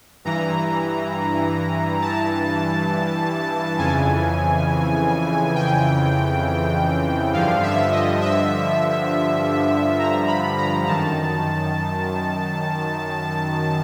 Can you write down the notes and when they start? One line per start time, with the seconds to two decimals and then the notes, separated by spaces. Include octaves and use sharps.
0.25 G2 E3 A#5
2.02 A5
3.79 F2 C#3 E3 G#5
5.56 G5
7.33 G2 D3 F3 F5
7.63 E5
7.92 D#5
8.21 E5
9.99 A#5
10.28 B5
10.58 A#5
10.87 F#2 D#3 A5